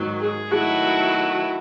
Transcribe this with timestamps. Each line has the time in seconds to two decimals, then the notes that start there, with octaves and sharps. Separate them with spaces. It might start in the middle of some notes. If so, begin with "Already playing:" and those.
Already playing: G#2 D#3 F#3
0.21 G#4
0.50 D#3 F#3 A3 E4 F#4